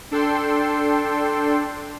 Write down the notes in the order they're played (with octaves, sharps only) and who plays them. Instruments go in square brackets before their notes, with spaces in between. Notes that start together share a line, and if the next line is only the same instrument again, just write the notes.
[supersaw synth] D4 A4 G5 C6